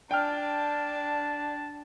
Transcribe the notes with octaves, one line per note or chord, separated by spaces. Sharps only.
D4 G5 A5 F6